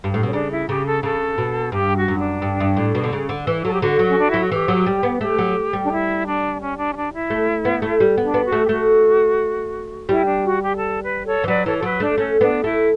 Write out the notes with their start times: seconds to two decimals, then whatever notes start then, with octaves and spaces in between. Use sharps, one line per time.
0.04 G2
0.14 A2
0.23 B2 C#4
0.33 C#3 D4
0.50 E4
0.68 C#3 G4
0.85 A4
1.03 C#3 A4
1.38 B2
1.72 G2 G4
1.96 F#4
2.08 F#2
2.19 D4
2.42 G2
2.60 G2
2.77 A2
2.95 B2
3.04 D3
3.13 C#3
3.29 D3
3.47 E3
3.65 F#3 A4
3.73 G4
3.82 D3 F#4
3.99 F#3
4.09 C#4
4.20 D4
4.30 F#3 E4
4.41 F#4
4.51 E3 G4
4.68 F#3
4.86 G3
5.03 B3
5.20 A3 G4
5.39 F#3
5.73 G3
5.84 D4
5.91 E4
6.26 D4
6.61 C#4
6.78 D4
6.92 C#4
6.95 D4
7.13 E4
7.30 A3
7.65 B3
7.82 A3
8.00 G3
8.18 B3 D4
8.34 B3
8.46 F#4
8.52 A3
8.65 G4
8.69 A3 F#4
10.09 G3 E4
10.26 D4
10.44 F#4
10.61 G4
10.78 A4
11.02 B4
11.25 A4 C#5
11.44 E3
11.48 F#3 B4 D5
11.65 E3 A4 C#5
11.78 A4
11.83 F#3 B4
12.00 A3 D4
12.17 A3 C#4
12.41 B3 D4
12.64 A3 E4